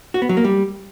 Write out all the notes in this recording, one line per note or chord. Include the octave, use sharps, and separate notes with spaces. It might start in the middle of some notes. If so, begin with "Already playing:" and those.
F#4
B3
F#3
A#3
G3